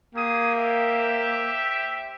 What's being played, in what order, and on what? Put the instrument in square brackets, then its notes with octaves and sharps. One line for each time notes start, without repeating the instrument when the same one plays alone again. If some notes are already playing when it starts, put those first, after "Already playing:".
[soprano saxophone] A#3 [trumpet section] G4 G#4 D#6
[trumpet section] G4 C5 E5